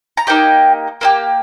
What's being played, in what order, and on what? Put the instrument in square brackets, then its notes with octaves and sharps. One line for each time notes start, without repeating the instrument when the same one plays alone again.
[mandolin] A#5
A#3 D#4 G4 G5
A#3 D#4 G4